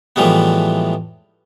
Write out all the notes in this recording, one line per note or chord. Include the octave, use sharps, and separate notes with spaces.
A2 E3 F3 G3 G#3 B3